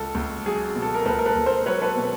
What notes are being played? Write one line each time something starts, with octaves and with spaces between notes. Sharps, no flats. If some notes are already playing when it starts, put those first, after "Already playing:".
Already playing: C#2 A4
C#2
F#3 G#4
B2
A4
A#4
C#2 A4 B4
A#4
A4 B4
C#2
A#4 C5
F#3 B4 C#5
A4 B4
B2